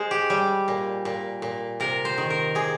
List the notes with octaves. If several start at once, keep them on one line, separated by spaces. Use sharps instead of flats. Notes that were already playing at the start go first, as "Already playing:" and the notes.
Already playing: G#3 C5
G4
G3
A#2
A#2
A#2
C3 A#4
C5
D#3
A#4
C3 G#4